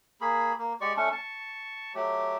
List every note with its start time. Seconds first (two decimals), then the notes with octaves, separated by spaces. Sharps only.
0.21 A#3 G#4 B5
0.58 A#3
0.81 G#3 G4 D5 C#6
0.97 A3 C#4 D4 C#6
1.12 A5 C#6
1.95 F#3 A3 G4